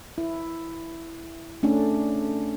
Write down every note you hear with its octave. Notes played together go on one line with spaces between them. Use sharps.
E4
A3 C#4 D4